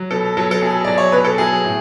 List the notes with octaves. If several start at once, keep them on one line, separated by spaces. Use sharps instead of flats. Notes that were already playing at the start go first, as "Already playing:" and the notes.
Already playing: F#3
B2 A4
F#3 A4
A4
B2 G#4
F#3 D5
C#5
B2 B4
A4
F#3 G#4
A2